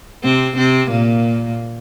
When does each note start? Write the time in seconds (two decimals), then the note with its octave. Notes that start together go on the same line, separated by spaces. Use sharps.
0.24 C3 C4
0.57 C3 C4
0.91 A#2 A#3